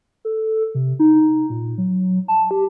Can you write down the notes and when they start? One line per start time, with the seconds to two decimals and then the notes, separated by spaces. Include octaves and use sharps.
0.25 A4
0.75 C3
0.99 D#4
1.50 A#2
1.78 F#3
2.28 A5
2.51 G4